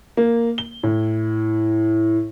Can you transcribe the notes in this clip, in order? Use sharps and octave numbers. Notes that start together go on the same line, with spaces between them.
A#3
G7
A2